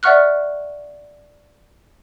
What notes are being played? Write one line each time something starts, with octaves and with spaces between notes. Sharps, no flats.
D5 E5 F#5 C#6 F6 F#6